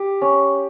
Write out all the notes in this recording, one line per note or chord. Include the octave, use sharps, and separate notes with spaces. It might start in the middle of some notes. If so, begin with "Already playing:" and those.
Already playing: G4
C#4